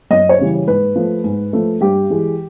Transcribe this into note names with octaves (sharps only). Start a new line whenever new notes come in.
F#2 D#5
C#5
C#3 E3 G3
G#2 B4
F3 A3
G#2
F3 A3
G2 G4
E3 G#3